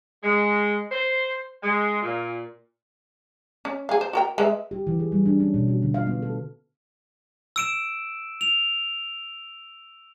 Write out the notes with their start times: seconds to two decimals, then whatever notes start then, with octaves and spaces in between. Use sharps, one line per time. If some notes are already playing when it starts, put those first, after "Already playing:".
0.24 G#3
0.92 C5
1.63 G#3
2.02 A#2
3.65 C#4
3.89 G#4 F5
4.01 C5
4.13 F#4 A#4 G5
4.38 G#3 B4 E5
4.71 G4
4.87 E3
4.99 G#4
5.12 G3
5.26 D4
5.40 C#4
5.54 B2
5.68 F#4
5.82 D3
5.94 F5
6.07 B3
6.22 A4
7.56 E6 D7 E7
8.41 F7